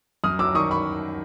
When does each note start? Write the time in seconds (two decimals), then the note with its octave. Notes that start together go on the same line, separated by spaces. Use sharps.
0.24 F#2 D#6 F6
0.39 F#3 D6 E6
0.55 D#3 C#6 D#6
0.71 B5 C#6